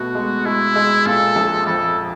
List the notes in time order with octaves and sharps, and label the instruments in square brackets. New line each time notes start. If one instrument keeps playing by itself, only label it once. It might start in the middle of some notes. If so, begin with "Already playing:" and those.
Already playing: [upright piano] B2 A3 [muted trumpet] F#4
[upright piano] G#3
[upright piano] G#3 [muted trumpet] E4
[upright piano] G#3
[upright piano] A#2 [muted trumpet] A4
[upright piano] A#1
[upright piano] F2 [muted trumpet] A4